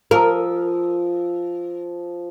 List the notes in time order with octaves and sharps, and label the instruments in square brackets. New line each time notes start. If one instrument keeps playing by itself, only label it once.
[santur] F3 D#6 E6 [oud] A#4